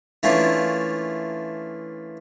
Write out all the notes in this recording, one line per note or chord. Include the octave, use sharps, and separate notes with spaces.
E3 A3 A#3 C#4 D4 F4